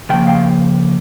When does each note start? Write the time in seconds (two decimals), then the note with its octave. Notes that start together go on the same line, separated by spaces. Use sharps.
0.09 C#3 F3 A#3 G5
0.27 F5 G5